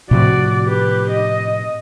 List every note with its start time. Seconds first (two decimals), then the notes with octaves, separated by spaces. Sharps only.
0.11 A2 C3 F3 F#4 D5
0.68 G4 B4
1.11 D#5